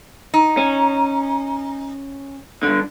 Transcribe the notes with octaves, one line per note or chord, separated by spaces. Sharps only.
D#4
C#4
G2 D3